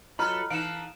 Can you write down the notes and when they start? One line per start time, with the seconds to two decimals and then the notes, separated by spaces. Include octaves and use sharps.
0.19 F#3 F4 A4 B4 D#5 A#5 B5 F6
0.50 E3 D#4 B4 F5 A5 F6 D7 E7